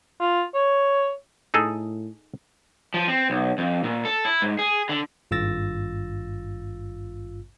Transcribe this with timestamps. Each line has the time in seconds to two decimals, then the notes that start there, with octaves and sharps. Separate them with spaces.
0.20 F4
0.55 C#5
1.54 A2 D#4 G#4 A4
2.94 F3
3.08 C4
3.30 B1
3.58 F2
3.84 A#2
4.05 A4
4.25 E4
4.42 G#2
4.59 G#4
4.89 D3
5.31 G#1 G2 F4 E6 A6 A#6